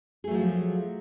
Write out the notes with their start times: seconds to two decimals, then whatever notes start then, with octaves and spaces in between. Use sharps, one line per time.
0.24 G#4
0.27 A3
0.31 F#3
0.34 F3